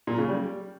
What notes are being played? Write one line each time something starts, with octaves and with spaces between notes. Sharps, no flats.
A#2
C#3
G3